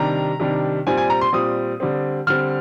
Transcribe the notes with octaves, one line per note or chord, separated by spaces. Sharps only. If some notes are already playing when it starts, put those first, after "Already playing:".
Already playing: C3 D#3 G3 D4 A#5
C3 D#3 G3 D4
A#2 G3 C4 G#5
G#5
A#5
C6
A#2 G3 C4 D#6
D3 G3 C4
D3 G3 C4 F6